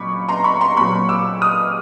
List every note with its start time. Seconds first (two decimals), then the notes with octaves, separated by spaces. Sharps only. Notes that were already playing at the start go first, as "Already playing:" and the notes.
Already playing: A#2 F#3 B5 C#6 D6
0.29 A#5 C6
0.44 B5 C#6
0.61 A#5 C6
0.77 A#2 F#3 B5 C#6
1.09 D6 E6
1.42 D#6 F6